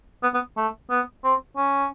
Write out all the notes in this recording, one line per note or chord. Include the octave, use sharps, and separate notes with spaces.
B3
B3
A3
B3
C4
C#4